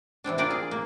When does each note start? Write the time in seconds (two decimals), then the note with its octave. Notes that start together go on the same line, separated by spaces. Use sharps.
0.24 C3 E3 C4 D4
0.38 C4 D4 F4 A#4 D5
0.50 G#4
0.71 A#3